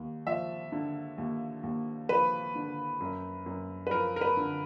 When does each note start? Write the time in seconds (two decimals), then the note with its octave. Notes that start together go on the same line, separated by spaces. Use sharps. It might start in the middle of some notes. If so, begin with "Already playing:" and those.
Already playing: D#2
0.26 F3 E5
0.72 D3
1.18 D#2
1.63 D#2
2.09 F3 B4
2.55 D3
3.00 F#2
3.46 F#2
3.87 B4
3.91 F3 A#4
4.16 A#4
4.21 B4
4.37 D3